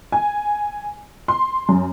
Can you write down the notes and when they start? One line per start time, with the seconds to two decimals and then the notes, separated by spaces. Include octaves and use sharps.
0.12 G#5
1.28 C6
1.69 F#2